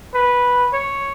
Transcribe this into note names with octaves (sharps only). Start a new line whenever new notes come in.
B4
C#5